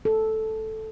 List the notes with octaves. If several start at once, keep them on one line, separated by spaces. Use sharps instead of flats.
A4